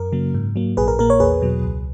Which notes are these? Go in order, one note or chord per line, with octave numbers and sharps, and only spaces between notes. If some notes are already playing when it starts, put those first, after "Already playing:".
Already playing: F#2 A#4
C#3 F#3 A#3
G#2
F#3 A#3
A#1 G#4 B4
A#4
A#2 A#3 A#4
A#4 C#5
E2 G#4 B4
B2 F#3
C#2